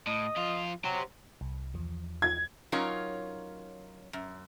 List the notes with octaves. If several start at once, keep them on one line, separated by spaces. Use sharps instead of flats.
A2 D#5
F2 F4
F#3 G4 C5
C2
E2 F3
G#6
F#3 C#4 D#4 F4 A#4 C#5
F#2